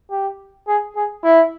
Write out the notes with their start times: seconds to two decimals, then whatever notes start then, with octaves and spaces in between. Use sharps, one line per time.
0.11 G4
0.68 G#4
0.96 G#4
1.24 E4